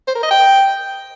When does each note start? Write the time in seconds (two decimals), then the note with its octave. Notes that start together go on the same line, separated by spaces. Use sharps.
0.07 C5
0.15 A#4
0.23 D#5
0.31 G5